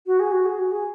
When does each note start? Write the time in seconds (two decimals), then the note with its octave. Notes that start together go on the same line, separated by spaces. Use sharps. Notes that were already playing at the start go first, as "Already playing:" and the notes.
0.07 F#4
0.20 G#4
0.32 F#4
0.46 G#4
0.59 F#4
0.72 G#4